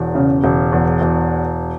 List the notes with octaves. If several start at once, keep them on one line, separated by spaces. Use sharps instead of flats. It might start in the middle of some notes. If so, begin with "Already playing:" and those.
Already playing: E1 E2
C#3
E1
E2
E1